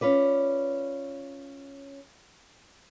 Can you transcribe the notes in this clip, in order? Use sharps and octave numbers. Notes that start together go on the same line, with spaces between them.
C#4 F4 B4 D5